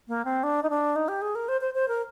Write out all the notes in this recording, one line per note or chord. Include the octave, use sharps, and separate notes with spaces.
A#3
C4
D4
D#4
D4
D#4
G4
G#4
A#4
C5
C5
C5
A#4